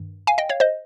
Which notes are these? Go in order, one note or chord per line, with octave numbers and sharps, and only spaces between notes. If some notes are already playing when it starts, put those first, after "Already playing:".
Already playing: G2 D#3
F5 G#5
D#5 G5
C#5 F5
C5 D#5